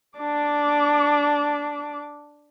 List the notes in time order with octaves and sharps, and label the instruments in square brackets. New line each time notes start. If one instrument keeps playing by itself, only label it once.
[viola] D4 D6